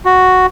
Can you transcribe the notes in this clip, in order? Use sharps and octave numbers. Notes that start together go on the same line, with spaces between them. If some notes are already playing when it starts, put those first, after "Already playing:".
F#4